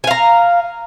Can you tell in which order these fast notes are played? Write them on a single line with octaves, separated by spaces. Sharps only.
G#5 F5 A#5